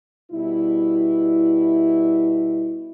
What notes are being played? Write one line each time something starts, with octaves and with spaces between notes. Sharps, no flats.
B2 G3 E4